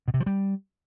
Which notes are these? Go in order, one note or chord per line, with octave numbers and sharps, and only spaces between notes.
B2
C3
F3
G3